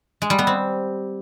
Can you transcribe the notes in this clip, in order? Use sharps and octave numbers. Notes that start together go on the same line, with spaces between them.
G#3
G3
B3
C4